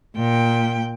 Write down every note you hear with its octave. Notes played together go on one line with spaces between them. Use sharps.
A#2 G5